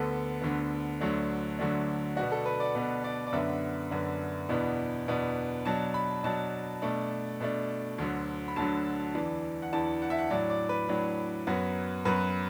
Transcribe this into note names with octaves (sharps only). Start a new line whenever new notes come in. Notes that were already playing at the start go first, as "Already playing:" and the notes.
Already playing: D2 D3 B3 A4
D2 D3 B3
D2 D3 F#3 A3 D4
D2 D3 F#3 A3 D4
B2 B3 D4 F#4
A4
B4
D5
B2 B3 D4
D5
D5
F#2 D3 B3 D4 E5
F#2 D3 B3 D4
E2 B2 B3 D4
E2 B2 B3 D4
B2 F#3 D4 A5
B5
B2 F#3 D4 A5
B2 A3 D4
B2 A3 D4
D2 D3 F#3
B5
D2 D3 F#3 A5
E2 E3 D4
F#5
E2 E3 D4 A5
F#5
E5
F#5
A2 F#3 D4 D5
D5
B4
A2 F#3 D4
F#2 F#3 B3
F#2 F#3 B3 B4